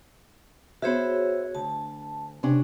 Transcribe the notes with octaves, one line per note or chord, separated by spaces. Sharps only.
B3 F#4 G#4 C5 C#5 E5
D2 A5
C3 C#4 D4